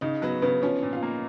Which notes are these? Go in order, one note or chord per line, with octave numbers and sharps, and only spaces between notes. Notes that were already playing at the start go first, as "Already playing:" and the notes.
C#3 D#4 D#5
F#3 B3 B4
C#3 B3 B4
F3 C#4 C#5
A#2
F4 F5
A#3